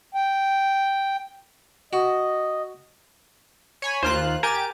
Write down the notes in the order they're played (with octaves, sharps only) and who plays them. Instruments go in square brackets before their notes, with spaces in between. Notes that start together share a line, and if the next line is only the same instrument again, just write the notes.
[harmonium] G5
[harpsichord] F#4 [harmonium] D#5
[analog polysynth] C#5 G#5 B5
[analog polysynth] D#2 F4 F#6 [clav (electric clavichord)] A#4 C5
[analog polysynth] G4 A6 D7 [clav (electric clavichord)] A#4 G#5 A#5